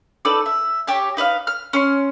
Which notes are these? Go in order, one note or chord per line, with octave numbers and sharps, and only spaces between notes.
D#4 A4 B4 D5
E5
G4 C#5 A5
D#4 B4 D#5 F5
F6
C#4 C6